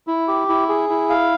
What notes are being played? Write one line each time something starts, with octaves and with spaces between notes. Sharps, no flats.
E4
G4
E4
G#4
E4
F5